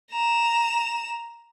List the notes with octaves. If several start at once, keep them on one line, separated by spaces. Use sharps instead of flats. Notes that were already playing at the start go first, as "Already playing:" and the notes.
A#5 E7